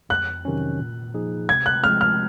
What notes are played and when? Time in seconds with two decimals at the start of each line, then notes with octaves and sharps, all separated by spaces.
0.09 F2 F#6
0.45 C3 D#3 F#3 C#4
0.79 A#2
1.14 F3 A#3 D#4 G#4
1.49 C3 G#6
1.66 F#6
1.83 F3 G#3 C4 F6
2.01 F6